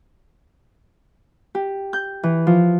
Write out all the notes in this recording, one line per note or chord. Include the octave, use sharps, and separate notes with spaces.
G4
G6
E3
F3